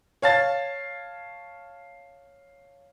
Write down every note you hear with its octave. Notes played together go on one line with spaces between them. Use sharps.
C#5 F5 A5 A6